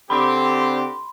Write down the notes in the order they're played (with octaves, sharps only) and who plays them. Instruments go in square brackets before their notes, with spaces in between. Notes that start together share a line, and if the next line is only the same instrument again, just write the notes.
[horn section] D3 C4 G4 [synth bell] B5 C6